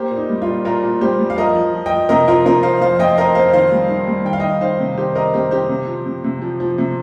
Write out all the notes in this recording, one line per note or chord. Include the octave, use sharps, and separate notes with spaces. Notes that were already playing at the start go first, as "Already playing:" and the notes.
Already playing: A#3 G4 C5
A#2
D#4
G3
F4
A#2
A#2 F4 A#4
A#2
G3 G4 C5
G3
F5
F3 A#4 D#5
F3
F3
D#5 G5
F3
C3 A#4 D#5
F3 F4 A#4
C3 F4 A#4
F3 C5 F5
F2 C5 F5
F2 D#5 G5
C4 A#4 D#5
C4 C5 F5
D#3 C5 F5
G3
D#3
G3
D#3 G5
F5
D#3 D#5 G5
D#3 C5 F5
C3
D#3 G4 C5
C4 A#4 D#5
C3 G4 C5
C4 G4 C5
C3
F3
C3
C3
F3
F3
C3